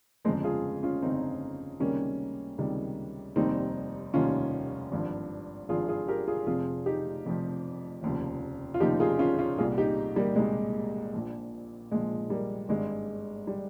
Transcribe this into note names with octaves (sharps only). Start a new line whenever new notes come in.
G1 F2 C#3 F3 G#3 C4
F4 G#4
C#4 F4
G1 F2 C#3 F3 C4 D#4
C#2 C3 D#3 G3 A#3 C#4
C#2 C3 D#3 G3
F1 D#2 D#3 G3 C4 D#4
F1 D#2 D#3 G3 C#4 F4
G#1 G2 F3
G#1 G2 F3 F4 G#4
F4 G#4
G4 A#4
F4 G#4
F1 F2 C3 F3 F4 G#4
D#4 G4
F1 F2 C3 F3
F1 D#2 C#3 F3
F4
F1 D#2 C#3 F3 D#4 G4
F4 G#4
C#4 F4
C#4 F4
C2 A#2 G3 F4 G#4
D#4 G4
G3 A#3
C2 A#2 G3 G#3
A#1 A#2 F3
A#1 A#2 F3 G#3
G3 A#3
G#1 G2 G3 G#3
G3